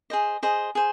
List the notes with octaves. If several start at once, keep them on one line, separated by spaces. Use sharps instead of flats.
G#4 C5 D#5
G#4 C5 D#5
G#4 C5